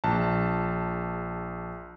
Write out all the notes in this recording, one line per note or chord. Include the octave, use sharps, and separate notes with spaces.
A#1 A5